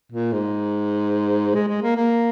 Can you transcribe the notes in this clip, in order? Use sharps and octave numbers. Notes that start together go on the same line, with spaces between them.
A#2
G#2
G#3
G#3
A#3
A#3